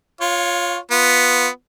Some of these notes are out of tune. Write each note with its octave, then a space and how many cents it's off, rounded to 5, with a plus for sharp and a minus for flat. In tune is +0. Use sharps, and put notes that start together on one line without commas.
F4 +0 C#5 +0 F5 +30
B3 +0 F4 +0